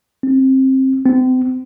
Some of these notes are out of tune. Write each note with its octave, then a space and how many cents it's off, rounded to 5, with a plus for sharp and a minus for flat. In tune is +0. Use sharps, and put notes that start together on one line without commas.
C4 +20
C4 -35